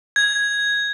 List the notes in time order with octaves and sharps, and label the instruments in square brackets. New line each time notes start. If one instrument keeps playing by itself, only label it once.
[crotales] G#6